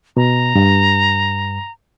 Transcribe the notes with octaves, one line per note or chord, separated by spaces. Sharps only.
B2 A#5
G2